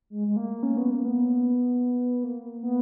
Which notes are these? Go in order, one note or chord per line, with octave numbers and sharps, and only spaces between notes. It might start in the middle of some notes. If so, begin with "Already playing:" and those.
G#3
G#3
A#3
C#4
B3
A#3
B3
A#3
B3